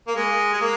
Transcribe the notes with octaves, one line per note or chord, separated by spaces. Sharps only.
A#3
G#3
G#3
A#3